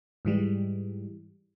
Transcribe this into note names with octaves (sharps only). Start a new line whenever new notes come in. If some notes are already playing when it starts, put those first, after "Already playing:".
G#2 E3 G3 G#3